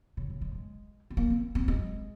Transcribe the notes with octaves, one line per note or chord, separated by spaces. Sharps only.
C#3
C#3
G#3
G#3
C4
A#3
C4
C4
G#3